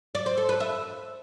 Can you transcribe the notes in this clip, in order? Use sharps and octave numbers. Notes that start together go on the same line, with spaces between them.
D5
C5
A4
B4
E5